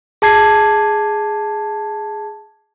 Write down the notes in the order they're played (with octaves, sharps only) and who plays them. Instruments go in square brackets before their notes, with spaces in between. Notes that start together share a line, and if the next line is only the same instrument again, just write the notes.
[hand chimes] G#4 A5 G#6 C7